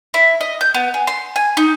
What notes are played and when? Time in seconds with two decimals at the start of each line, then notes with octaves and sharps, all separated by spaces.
0.14 E4
0.41 D#5
0.61 G6
0.74 B3
0.94 G#4
1.07 C6
1.36 G#5
1.57 D#4